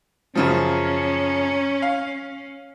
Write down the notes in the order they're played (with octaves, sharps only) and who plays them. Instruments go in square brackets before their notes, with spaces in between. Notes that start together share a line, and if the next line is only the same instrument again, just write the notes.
[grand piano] F#2 C#3 F3 [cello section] C#4
[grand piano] F5